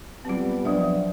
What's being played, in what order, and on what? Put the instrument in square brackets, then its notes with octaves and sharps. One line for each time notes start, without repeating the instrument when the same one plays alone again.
[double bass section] G3 [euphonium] B3 [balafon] C4 F4
[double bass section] F3 [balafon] F#3 E5 [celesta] D4 D5